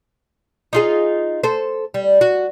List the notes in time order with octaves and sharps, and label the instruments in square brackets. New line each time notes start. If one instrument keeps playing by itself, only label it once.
[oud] D#4 F4 G#4
A4 C5
G3
F#4